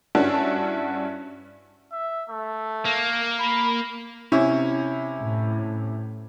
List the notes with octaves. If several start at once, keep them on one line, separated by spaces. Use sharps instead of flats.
G2 C#4 D4 E4 F#4 A5
E5
A3
A#3
B5
C3 C#4 E4
A2